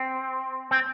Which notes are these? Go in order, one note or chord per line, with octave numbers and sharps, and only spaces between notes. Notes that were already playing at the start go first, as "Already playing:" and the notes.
Already playing: C4
C4